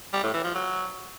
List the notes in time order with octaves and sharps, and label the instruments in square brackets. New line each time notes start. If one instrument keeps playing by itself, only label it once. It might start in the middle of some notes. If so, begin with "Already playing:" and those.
[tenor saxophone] G3
A2
E3
F3
F#3